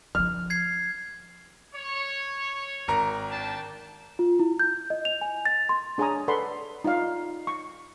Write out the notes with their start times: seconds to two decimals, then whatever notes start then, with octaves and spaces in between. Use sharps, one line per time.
0.15 F3 D4 F6
0.50 G#6 C7
1.73 C#5
2.88 G#1 A#4 A#5
3.30 D4 G5 A5
4.19 F4
4.39 E4
4.60 G6
4.90 D#5
5.05 F7
5.21 G#5
5.45 A6
5.69 C6
5.98 D4 G#4 C#5 G#5 A#5 D#6
6.28 A4 B4 D5 F#5 B5 C6
6.84 D#4 F4 D5 F5
7.47 C#6